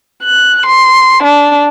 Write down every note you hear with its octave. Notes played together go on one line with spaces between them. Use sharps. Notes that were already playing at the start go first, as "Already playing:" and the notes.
F#6
C6
D4